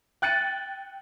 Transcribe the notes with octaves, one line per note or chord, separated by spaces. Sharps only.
G5 F#6 A6 C#7 D#7